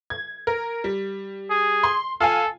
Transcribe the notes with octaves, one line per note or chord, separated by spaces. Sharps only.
G#6
A#4
G3
G#4
C6
F4 A4 F5 G#5